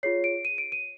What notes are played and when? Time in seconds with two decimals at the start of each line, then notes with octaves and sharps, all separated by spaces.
0.03 F4 G#4 C#5 C7
0.24 D7
0.45 D#7
0.58 D7
0.72 D#7